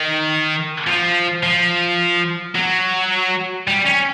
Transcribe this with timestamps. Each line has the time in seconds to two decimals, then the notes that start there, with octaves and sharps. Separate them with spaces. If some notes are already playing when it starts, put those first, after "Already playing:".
Already playing: D#3
0.87 F3
1.43 F3
2.55 F#3
3.67 G3
3.86 C#4